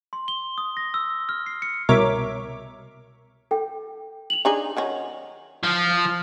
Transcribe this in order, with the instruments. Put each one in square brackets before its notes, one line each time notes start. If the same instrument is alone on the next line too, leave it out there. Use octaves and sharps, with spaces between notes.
[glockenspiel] C6
G7
D#6
A#6
E6
F6
C7
C#7
[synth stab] C2 B2 A#4 C#5 E5 D6
[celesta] A4 G5
F7 F#7
[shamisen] D4 D#4 G#4
D#3 F#3 C#4
[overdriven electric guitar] F3